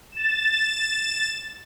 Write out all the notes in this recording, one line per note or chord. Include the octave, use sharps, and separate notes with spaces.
A6 E7